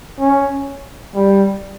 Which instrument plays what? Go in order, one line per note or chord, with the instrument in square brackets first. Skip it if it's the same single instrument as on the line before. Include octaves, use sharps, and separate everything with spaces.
[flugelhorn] C#4
G3